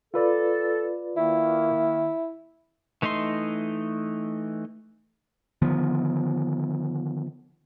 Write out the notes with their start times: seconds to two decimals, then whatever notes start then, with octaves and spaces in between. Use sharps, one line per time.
0.14 F4 A4 B4 D5
1.17 D#3 A#3 E4
3.02 E3 A3 D#4 D#5 C6
5.62 D3 D#3 F3 B3